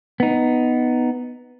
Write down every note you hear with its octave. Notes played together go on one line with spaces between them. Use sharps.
B3 D#4